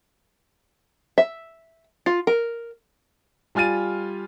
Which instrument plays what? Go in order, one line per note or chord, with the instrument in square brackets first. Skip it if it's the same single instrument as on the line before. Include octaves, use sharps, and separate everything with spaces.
[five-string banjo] E5
F4
A#4
[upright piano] G3 F4 G#5 F6 A6 D#7